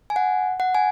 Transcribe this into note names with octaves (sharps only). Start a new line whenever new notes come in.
G#5
F#5
F#5
G#5